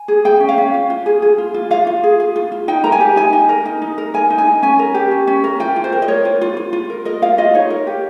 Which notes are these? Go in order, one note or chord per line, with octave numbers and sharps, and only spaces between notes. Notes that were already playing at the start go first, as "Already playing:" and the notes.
Already playing: G#5
G#4
G#4 G5
C#4
F5
C#4
F4
F4
G#4
G#4
F4
F4
F4 F5
F4
G#4
G#4
F4
F4
D#4 G5
A#4 A#5
G#5
G4
D#4 G#5
D#4
A#4
D#4
D#4
A#4
A#4 G#5
D#4
G#5
D#4
C#4 G#5
A#4
G4
C#4
C#4
A#4
F4 G5
F4
C5
A#4
D#5
A#4 C#5
F4
F4
F4
F4
A#4
A#4 D#5
F4 F5
F4 D#5
D#4 C#5
A#4
G4